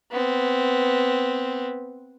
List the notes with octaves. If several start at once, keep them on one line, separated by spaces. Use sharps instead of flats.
B3 C4